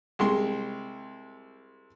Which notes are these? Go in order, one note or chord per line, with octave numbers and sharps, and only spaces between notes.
C2 G#3 C6